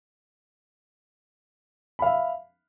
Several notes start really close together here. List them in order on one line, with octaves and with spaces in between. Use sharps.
B5 F5 E5